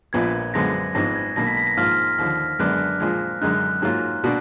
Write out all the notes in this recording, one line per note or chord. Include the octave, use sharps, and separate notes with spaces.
A#1 A#2 F3 B3 G#6
F#2 D3 F3 G#3 B3 A#6
G#1 G#2 F3 B3 A#6
G#6
B1 B2 A#3 A#6
B6
B6
A#6
G#2 F3 A#3 F4 F6
D#2 D3 F3
F#2 D3 G#3 B3 D4 F#6
A#2 F3 G#3
F#2 D3 G#3 D#4 F#6
G#2 F#3 A#3 F4
B2 A#3 D4 F#4